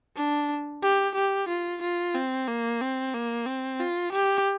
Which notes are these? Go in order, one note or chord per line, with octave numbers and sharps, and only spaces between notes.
D4
G4
G4
F4
F4
C4
A#3
C4
A#3
C4
F4
G4